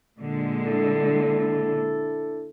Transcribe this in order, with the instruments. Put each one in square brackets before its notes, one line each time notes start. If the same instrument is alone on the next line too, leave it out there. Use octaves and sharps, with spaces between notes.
[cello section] A#2 D3 G#3
[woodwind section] D4 E4 A4